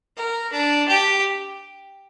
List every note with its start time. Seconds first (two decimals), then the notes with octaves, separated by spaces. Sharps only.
0.17 A#4
0.53 D4
0.89 G4